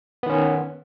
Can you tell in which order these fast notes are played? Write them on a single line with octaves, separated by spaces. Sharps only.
B3 D#3 C#4